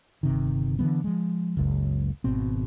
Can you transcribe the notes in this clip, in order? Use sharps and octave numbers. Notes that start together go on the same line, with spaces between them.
G1 C3 D#3
D3 E3 G#3 B3
F3 G#3
F#1 C#2
G#1 B2 C4